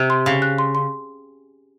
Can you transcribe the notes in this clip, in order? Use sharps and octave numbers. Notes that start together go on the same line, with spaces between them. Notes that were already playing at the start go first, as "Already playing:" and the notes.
Already playing: C3
C6
C#3 F5
F#6
C6
C6